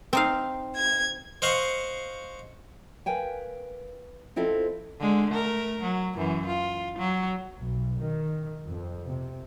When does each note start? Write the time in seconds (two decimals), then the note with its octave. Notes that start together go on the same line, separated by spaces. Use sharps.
0.13 C4 D#4 F5
0.77 G#6
1.42 C5 D#5 F5 F#5 C#6
3.06 A#4 B4 F5 G5 G#5
4.36 F3 C4 E4 F4 A4 D#5
5.00 D3 G#3
5.30 A3 A#4
5.82 F#3
6.16 F#2 E3
6.47 F4
6.98 F#3
7.56 B1
8.01 D#3
8.68 F2
9.07 C3